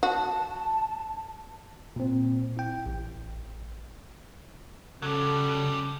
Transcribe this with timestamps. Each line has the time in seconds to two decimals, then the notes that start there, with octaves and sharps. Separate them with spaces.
0.03 F#4 A5
1.96 A#2 C4
2.57 E4 G5
2.86 A1
5.02 C#3 F#3 G3 A4